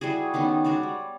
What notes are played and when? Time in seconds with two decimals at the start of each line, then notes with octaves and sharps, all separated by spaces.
0.01 G3 E4 F#4 G#4
0.34 D#3 B3 C#4 D#4
0.64 G#3 F#4 C#5 D5
0.83 G3